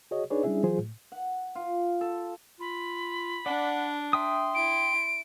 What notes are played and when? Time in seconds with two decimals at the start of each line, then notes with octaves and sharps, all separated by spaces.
0.11 F#4 G#4 C#5 D#5
0.30 D4 D#4 G#4 B4 C#5 D5
0.44 G3 C#4 D4 E4 G#4 E5
0.63 E3 F#3 F4 G#4 C5
0.78 A2
1.12 F#5
1.55 F4
2.01 A4
2.60 F4 B5
3.46 D4 D5 F#5
4.13 E5 G5 C6 D#6
4.55 E4 D7